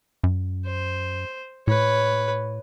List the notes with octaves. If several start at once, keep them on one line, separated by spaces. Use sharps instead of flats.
F#2
C5
A2 B4 C#5